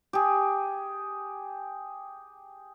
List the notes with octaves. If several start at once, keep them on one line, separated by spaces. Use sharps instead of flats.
G4 G#4